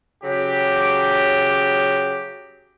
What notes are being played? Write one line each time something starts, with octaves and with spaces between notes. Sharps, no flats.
C#3 F#3 G4